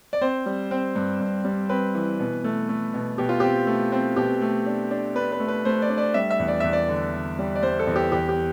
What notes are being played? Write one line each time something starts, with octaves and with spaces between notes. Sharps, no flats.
D5
C4 C5
G3
C4
G2
G2
G3
C4 B4
E3
B2
A3
A3
B2
B2 G4
F4
C4 G4
A3
C4
B2 G4
A3
D4
D4
D4 B4
B4
A3
B4
A3 C5
D5
D4
D5
G3 E5
E5
E2
D5
E2 E5
D5
D3
D3
G3
D5
G3 C5
A4
E2
G4
E2 G4
G4